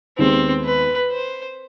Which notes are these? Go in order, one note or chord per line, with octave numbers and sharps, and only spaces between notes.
D#2 D#3 G#3 B3 C4
B4
C5